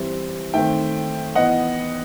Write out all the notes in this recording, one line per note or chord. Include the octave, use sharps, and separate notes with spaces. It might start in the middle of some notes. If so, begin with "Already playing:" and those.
Already playing: E3 G3 C4 E5
D#3 A3 C4 E5 G5
E3 B3 D#5 F#5